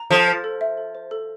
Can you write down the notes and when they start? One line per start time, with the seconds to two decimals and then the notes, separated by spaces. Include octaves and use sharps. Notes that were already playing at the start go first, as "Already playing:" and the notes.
Already playing: A#5
0.11 F3 A4
0.28 C5
0.44 A4
0.61 E5
0.77 A4
0.95 C5
1.11 A4